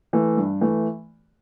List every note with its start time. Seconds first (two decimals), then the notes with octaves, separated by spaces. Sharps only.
0.13 E3 A3
0.37 G2
0.61 E3 A3